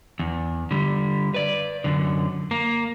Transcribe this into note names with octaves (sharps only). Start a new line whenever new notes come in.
E2
D3 G3
B4 D5
F#2 D3
A#3